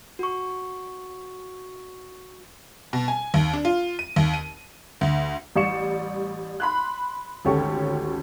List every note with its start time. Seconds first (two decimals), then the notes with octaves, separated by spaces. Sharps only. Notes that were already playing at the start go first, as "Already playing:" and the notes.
0.19 F#4 C#6
2.93 B2
3.08 G#5
3.34 D#2
3.53 D4
3.65 F4
3.99 D#7
4.16 D#2
4.34 D#7
5.01 D2
5.56 A1 G3 D5 C#6 C#7 E7
6.60 B5 C6 F#6
7.45 G#1 D2 C#4 G4 A4 C#6